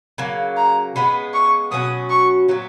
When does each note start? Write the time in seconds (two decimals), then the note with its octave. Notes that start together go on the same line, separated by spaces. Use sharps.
0.18 C#3 F#3 A#3
0.57 A#5
0.96 C#3 G#3 B3 B5
1.34 C#6
1.72 B2 F#3 C#4 F#4 D#6
2.10 C#6
2.48 A#2 F#3 B3